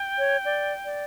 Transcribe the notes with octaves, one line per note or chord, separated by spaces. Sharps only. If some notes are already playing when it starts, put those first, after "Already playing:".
Already playing: G5
C#5
D5
D5